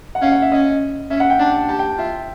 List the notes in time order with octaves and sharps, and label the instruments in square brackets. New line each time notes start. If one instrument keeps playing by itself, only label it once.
[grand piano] F#5
[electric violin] C#4 [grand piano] F5
[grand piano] F#5
E5
[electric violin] C#4 [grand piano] D#5
[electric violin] C#4 [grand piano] E5
[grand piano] F#5
G5
[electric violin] D4 [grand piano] A5
[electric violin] G4 [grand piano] A5
[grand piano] G5
[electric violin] F4 [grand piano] E5